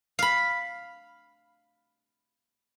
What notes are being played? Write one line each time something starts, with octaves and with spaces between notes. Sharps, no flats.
F5 B5